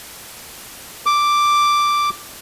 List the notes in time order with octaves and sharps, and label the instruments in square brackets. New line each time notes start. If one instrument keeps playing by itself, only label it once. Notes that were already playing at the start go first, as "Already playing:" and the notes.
[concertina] D6